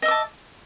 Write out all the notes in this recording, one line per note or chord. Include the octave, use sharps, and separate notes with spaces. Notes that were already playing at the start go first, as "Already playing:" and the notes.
D#5 E5 A5 D6